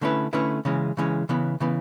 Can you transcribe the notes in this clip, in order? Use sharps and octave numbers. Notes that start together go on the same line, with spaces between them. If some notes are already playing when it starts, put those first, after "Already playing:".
D3 A3 C#4 E4 B4
D3 A3 C#4 E4 B4
C#3 E3 G#3 C#4
C#3 E3 G#3 C#4
C#3 E3 B3
C#3 E3 B3